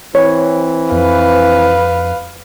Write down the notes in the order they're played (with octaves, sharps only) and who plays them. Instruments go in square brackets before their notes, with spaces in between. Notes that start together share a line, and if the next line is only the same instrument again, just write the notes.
[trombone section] E3 C4 [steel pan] C#5
[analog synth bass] F2 [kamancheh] B4 F5